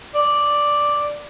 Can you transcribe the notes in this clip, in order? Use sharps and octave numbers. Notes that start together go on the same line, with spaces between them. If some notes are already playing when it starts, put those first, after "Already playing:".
D5